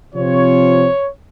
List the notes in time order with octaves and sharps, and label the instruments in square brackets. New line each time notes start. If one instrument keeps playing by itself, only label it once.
[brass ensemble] C3 F3 C4 F4 C#5